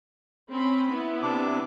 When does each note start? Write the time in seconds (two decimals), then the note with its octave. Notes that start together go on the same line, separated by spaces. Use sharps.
0.50 C4 C#4 B5
0.91 B3 E4
1.22 C3 D4 D6